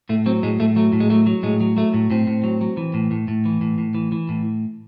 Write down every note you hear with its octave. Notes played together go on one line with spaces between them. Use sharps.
A2 A3
F#3 C4
A2 G#3
A2 A3
F#3 A3
A2
G#3
F#3 A3
F#3
A2 G#3
F#3
F#3 A3
A2
A2 C4
A2
F#3
F#3
E3
A2
A2
A2
E3
A2
A2
E3
E3
A2